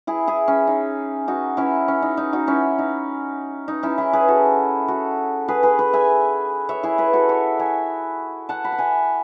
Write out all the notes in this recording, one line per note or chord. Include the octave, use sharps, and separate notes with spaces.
E4 G#4
E4 G#4
C#4
D#4
D#4 F#4
C#4 E4
C#4
D#4
D#4
D#4 F#4
C#4 E4
D#4
D#4
C#4 E4
E4 G#4
G#4 B4
F#4 A4
F#4 A4
G#4 B4
G#4 B4
G#4 B4
E5 G#5
C#5 E5
E4 G#4
G#4 B4
F#4 A4
C#5 E5
E5 G#5
F#5 A5
B5
A5
E5 G#5